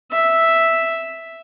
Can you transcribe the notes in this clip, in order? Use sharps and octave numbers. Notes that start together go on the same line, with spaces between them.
E5